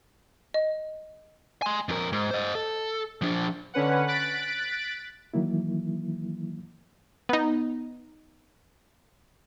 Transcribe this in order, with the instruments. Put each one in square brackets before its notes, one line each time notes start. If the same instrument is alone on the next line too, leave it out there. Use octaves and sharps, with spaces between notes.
[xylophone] D#5
[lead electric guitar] G#5 C6
F2 A#4
G#2
C5 D#5
A4
F3 D4
[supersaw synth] D3 C#4 B4 F#5
F#6 A6 B6 D7
[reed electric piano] D#3 E3 F#3 A#3 E4
[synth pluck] B3 D#4